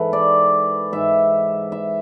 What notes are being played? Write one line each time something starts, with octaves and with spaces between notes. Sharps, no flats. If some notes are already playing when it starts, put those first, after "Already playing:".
Already playing: G#2 E3 A4 B4
D5
G#2 E3 E5
E5